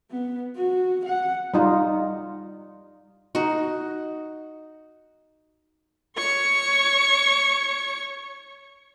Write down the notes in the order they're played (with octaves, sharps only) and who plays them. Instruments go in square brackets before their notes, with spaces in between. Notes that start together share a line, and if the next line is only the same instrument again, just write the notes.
[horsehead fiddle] B3
F#4
F#5
[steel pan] G3 D#4 F4
[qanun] D#4 F#4
[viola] C#5 C#6